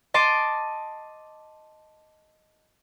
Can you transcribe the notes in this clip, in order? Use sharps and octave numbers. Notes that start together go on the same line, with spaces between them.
D#5 A5 C6 D6